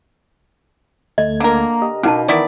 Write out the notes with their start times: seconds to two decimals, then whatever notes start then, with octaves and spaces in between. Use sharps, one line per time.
1.18 D2 A3 D#5 G#6
1.40 D3 A#3 A#4
1.82 G4 D#5
2.03 B2 D3 C#4 D#4 A#4 F5 A5
2.28 D#3 E3 B3 E4 D5 C#6